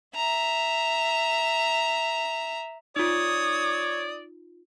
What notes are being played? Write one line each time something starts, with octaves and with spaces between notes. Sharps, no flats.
E5 A#5
D#4 F4 C#5 D5 D#6